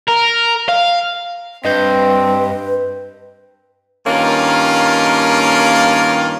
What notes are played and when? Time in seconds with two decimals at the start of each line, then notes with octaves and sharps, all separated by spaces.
0.08 A#4
0.69 F5
1.65 G2 C4 B4 D#5 G6
4.06 G2 D#3 A#3 C#4 F4